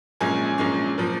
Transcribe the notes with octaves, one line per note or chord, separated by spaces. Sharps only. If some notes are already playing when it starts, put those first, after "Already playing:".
A#1 A#2 G#3 C#4 G#5
A#1 A#2 G#3 C#4
A#2 F3